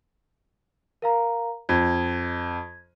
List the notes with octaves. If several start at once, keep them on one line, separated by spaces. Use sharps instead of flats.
A#4 F5 A#5
F2 G#6